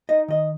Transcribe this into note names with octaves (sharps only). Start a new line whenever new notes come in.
D#4 D#5
D#3 D#5